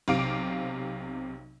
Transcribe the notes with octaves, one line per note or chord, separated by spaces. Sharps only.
B1 C3 F5 D6 D7